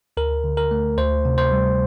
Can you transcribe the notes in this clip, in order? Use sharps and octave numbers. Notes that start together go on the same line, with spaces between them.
D2 A#4
D3
A#4
A3
D2 C5
C3
C5
G3